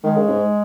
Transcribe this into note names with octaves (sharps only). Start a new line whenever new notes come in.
D#3 G#3
C#3
G#2